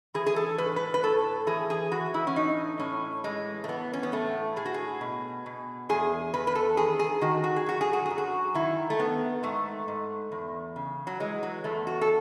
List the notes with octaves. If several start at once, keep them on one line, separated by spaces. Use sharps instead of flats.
E3 G#4
G#4
A4
A2 B4
B4
B4
A2 A4
E3 G#4
G#4
E3 F#4
E4
C#4
A2 D#4
A2 C#4
E3 G#3
A3
E3 B3
C#4
B3
A2 A3
A2 G#4
F#4
G#4
B2
B2
E2 G#4
E2 B4
B4
A4
D#3 G#4
G#4
D#3 F#4
F#4
G#4
F#2 F#4
G#4
F#4
F#2 G#4
F#4
D#3 E4
A3
D#3 B3
G#2 A3
G#2
E2
C#3
F#3
E3 G#3
F#3
E2 A3
F#4
A4